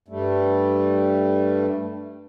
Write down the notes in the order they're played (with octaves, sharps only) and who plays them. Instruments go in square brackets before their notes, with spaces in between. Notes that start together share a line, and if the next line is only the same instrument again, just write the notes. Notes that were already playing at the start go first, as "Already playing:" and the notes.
[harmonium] G2 G3 A3